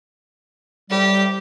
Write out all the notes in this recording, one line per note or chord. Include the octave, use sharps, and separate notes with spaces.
A2 C3 G3 G4